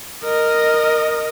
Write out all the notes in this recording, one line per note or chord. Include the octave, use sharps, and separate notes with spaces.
A#4 D#5